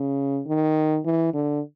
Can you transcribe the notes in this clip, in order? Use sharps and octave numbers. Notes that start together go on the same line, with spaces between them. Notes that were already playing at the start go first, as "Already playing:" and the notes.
Already playing: C#3
D#3
E3
D3